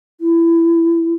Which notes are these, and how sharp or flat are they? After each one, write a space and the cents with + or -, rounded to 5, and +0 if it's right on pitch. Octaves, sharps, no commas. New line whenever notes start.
E4 +20